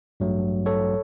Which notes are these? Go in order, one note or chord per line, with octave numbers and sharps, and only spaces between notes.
A1 G2 F#3 A3
A4 C#5